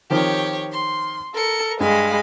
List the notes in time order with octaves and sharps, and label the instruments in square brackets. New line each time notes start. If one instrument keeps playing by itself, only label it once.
[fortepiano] D#3 F3 C4 [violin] G4 C#5
[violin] C6
[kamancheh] A4 [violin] A#4 C#7
[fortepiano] G2 [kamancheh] G#3 [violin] F5 B5